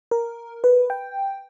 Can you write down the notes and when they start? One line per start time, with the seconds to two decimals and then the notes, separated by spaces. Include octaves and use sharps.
0.11 A#4
0.64 B4
0.90 G5